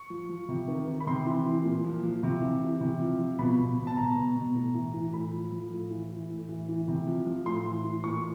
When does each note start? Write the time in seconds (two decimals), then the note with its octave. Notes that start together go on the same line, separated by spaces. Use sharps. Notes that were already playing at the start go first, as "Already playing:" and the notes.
Already playing: C#6
0.10 F3
0.29 F3
0.49 C3
0.68 D#3
0.87 D#3
1.00 B5
1.07 C3 C6
1.26 E3
1.46 E3
1.65 A#2
1.84 F3
2.03 F3
2.23 C3
2.42 E3
2.61 E3
2.81 C3
3.00 F3
3.20 F3
3.39 B2 B5
3.59 B2
3.78 B2
3.87 A5
3.97 B2 A#5
4.17 B2
4.36 B2
4.55 A2
4.75 E3
4.94 E3
5.13 A2 B5
5.33 F3
5.52 F3
5.71 A2
5.91 E3
6.11 E3
6.30 A2
6.49 E3
6.69 E3
6.88 C3
7.07 F3
7.27 F3
7.46 A2 C6
7.65 E3
7.85 E3
8.04 A#2 C#6